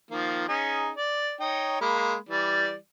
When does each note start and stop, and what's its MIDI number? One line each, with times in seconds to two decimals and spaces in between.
0.11 0.46 51
0.11 0.46 53
0.11 0.46 58
0.48 0.90 61
0.48 0.90 63
0.48 0.90 68
0.96 1.35 74
1.40 1.81 63
1.40 1.81 73
1.40 1.81 79
1.81 2.15 56
1.81 2.15 58
1.81 2.15 83
2.29 2.74 52
2.29 2.74 55
2.29 2.74 74